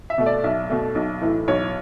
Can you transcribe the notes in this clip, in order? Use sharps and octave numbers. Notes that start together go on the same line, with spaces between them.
E5
B2 A3
D5
B1 E5
B2 A3
B1
A2 E3 A3
B1 C#5